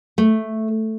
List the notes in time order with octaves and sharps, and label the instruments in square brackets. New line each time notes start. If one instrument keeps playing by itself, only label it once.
[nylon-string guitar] A3